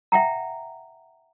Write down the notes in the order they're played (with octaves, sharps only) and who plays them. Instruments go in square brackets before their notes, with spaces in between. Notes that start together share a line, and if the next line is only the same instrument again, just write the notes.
[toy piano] E5 F#5 G5 A#5